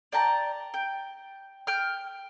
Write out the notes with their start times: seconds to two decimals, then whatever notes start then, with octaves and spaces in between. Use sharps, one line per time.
0.12 D5 G5 A5 A#5
0.74 G5
1.67 G5 F6